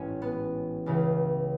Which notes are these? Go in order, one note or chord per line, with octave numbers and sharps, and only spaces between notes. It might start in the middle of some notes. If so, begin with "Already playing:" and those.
Already playing: A1 G#2 E3 C#4
B3
C#2 C#3 E3